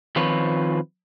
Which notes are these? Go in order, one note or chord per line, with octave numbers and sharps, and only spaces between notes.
D#3 F3 C4 F4 B4 C#5